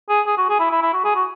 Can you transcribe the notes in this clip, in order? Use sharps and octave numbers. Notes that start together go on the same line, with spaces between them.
G#4
G#4
F#4
G#4
E4
E4
E4
F#4
G#4
F#4